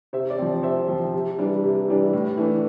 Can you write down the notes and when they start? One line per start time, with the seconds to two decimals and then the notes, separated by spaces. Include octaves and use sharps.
0.13 C3 C5 E5
0.30 D5
0.38 F3 C4
0.47 D5
0.63 C3 C5 E5
0.88 F3 C4
1.13 C3
1.38 E3 G3 D4
1.64 C3
1.89 E3 G3 D4
2.13 A2
2.38 E3 A3 D4